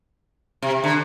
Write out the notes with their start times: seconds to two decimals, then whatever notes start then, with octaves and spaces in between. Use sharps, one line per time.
0.62 C3
0.84 D3